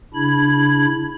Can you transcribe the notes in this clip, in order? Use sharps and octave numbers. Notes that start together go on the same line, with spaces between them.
C#3 D4 E4 B5 G#6